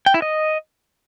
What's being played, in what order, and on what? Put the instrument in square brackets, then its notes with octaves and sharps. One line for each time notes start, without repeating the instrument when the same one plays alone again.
[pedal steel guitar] G5
E4
D#5